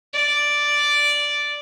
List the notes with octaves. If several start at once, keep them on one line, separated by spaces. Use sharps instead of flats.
D5